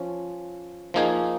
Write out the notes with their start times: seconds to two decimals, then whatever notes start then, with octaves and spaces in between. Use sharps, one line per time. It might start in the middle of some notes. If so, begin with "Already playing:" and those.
Already playing: F3 C#4
0.94 F3 A#3 D#4 G#4